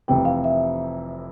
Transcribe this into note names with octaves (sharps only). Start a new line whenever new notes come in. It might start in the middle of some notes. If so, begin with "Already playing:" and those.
F1 F2 C3 E3 G5
F5
E5